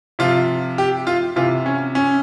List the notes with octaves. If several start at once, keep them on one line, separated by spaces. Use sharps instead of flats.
C3 F3 F4
G4
F4
C3 E3 F4
C#4
C#4